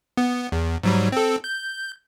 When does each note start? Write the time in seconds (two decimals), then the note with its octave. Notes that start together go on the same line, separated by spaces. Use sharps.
0.17 B3
0.52 E2
0.83 G#2 F#3 G3
1.12 C4 A4
1.44 G6